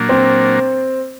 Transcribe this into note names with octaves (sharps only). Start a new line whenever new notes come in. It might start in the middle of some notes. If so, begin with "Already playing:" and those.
Already playing: A#2 F#3 A#3 D4
C4